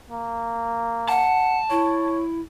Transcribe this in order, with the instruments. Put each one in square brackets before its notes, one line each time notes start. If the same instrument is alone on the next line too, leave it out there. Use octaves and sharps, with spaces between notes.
[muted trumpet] A#3
[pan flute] F#5 [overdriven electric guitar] A5
[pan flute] E4 [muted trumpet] C#5